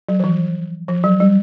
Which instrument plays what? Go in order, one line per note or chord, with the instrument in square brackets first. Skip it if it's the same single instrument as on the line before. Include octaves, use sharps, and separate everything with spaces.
[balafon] F#3
F3
E3
F3
F#3
G3